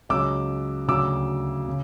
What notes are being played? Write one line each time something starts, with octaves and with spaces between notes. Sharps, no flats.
C#2 C#3 F#3 D6 E6
D2 C#3 F#3 D6 E6
C#3